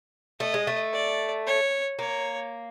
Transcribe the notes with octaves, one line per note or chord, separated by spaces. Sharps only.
A3 D#5
G#3
A3
D5
C#5
A#3 C#5